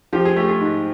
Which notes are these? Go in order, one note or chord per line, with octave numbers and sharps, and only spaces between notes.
F3 G4
G#4
A3 G4
G#4
G#2